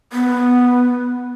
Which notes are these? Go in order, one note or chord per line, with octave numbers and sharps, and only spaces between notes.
B3